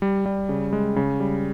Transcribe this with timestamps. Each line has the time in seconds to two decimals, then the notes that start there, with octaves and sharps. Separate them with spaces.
0.02 G3
0.26 G3
0.49 C#3
0.73 G#3
0.96 C#3
1.20 G3